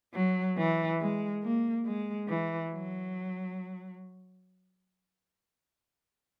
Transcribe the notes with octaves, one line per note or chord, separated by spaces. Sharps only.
F#3
E3
G#3
A#3
G#3
E3
F#3